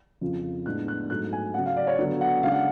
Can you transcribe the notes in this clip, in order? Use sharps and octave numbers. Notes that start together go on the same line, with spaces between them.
F2 C#3 F3
A2 G#3 B3 D4 F#6
F#6
G#2 F#3 A3 F#6
G#5
C#3 F#3 C#4 F#5
F5
D5
C#5
D3 F#3 B3
F#5
C#3 G#3 D4 F5
F#5